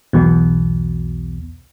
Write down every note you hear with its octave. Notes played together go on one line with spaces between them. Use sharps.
B1 E2 B2